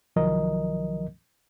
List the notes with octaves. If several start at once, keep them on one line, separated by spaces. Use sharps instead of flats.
C2 D#3 F3 F#3 A#4 D#5